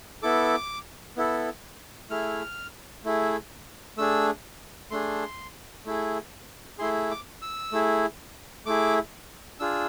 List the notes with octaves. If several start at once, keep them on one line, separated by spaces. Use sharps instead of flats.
B3 E4 A4 D6
B3 E4 A4
A3 E4 G#4 F6
A3 E4 G#4
A3 D4 G#4 E6
A3 D4 G#4 C6
A3 E4 G#4
A3 E4 G#4 C6
D6
E6
A3 E4 G#4
A3 E4 G#4 D6
D4 F4 G#4 E6